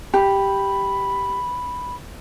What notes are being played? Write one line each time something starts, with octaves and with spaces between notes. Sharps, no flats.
G4 B5